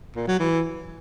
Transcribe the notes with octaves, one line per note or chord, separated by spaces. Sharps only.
A#2
F#3
E3